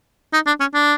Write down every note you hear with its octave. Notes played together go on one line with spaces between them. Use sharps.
D#4
D4
C#4
D4